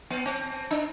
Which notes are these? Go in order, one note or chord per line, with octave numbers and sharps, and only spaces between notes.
B3
C4
D4